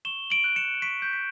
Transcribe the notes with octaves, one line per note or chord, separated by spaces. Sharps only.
C#6 E7 G7
D7 F#7
F#6
C#7 E7
C#6 B6 D7
G6
B6